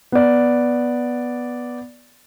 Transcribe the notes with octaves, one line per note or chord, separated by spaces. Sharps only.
B3 D5